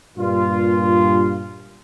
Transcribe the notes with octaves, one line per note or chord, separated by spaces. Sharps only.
G2 A#2 F4